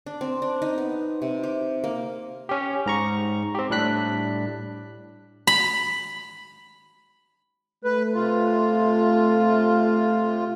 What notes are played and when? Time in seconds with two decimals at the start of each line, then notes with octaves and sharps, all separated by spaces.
0.06 D4
0.21 C4
0.42 D4
0.62 D#4
0.78 B3
1.22 C3
1.43 G4
1.84 A#3
2.49 C#4 G4
2.86 G#2 A#5 C#6
3.55 C4 G4
3.70 A2 G3 D4 F#6 B6
5.47 B5
7.84 A3 B4
8.14 C3 F4